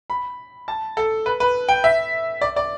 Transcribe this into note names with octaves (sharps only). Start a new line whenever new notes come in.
B5
A5
A4
B4
B4
G5
E5
D5
D5